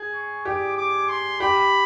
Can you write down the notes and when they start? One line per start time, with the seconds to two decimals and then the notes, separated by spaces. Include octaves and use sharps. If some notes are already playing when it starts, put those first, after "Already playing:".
Already playing: G#4
0.14 C#6
0.45 G4 D6
0.77 D6
1.09 C6
1.40 G4 B5